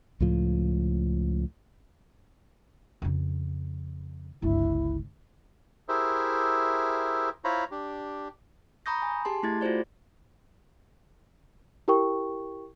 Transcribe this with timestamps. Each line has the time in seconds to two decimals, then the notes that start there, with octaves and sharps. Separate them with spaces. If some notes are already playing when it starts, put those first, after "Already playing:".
0.20 C#2 A2 F3
3.02 F2 C#3
4.42 G1 C#2 E4
5.88 E4 G4 G#4 A#4 C5 E5
7.44 E4 F4 C5 C#5 A#5 B5
7.71 D4 G4
8.86 A#5 B5 C#6 D#6 G6 A#6
9.02 G#5
9.25 G4 G#4 A5 C6
9.43 A3 E4 G#6 A6
9.61 F4 F#4 G#4 C5 D5
11.88 E4 G4 A#4 G5 C#6